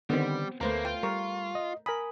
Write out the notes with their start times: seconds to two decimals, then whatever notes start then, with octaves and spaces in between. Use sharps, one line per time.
0.10 D3 D#3 G3 B3 C4
0.61 D2 A3 A#3 B4 C5 A#5
0.85 F4 G5
1.03 G3 A#4 C#6
1.55 D#5
1.86 A#4 G#5 B5 D#6